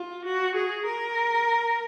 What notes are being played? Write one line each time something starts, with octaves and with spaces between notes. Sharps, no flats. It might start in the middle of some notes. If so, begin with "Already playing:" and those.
Already playing: F4
F#4
G#4
A#4